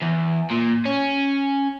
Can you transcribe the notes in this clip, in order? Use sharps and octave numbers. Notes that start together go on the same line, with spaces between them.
E2
A#2
C#4